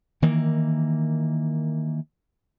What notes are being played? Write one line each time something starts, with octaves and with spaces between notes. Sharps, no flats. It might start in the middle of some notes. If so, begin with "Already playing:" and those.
D#3 E3 A#3